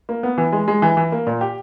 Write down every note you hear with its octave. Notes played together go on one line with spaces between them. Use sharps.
A#3
B3
E3
G#3
G#3
E3
E3
A#3
A#2
G4